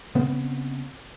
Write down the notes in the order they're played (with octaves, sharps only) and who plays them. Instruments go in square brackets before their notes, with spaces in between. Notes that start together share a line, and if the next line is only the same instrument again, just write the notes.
[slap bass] C#3 B3 C4